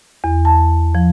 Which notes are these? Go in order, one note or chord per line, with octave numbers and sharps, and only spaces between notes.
E2
A5
F3